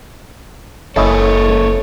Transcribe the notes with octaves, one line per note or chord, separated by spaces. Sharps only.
F#1 A#3 C#4 E4 A4 C#5 D#5